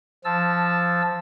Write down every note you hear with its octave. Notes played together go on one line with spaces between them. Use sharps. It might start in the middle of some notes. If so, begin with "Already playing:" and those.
F3 A5 E6